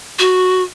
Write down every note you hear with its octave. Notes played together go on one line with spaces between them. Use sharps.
F#4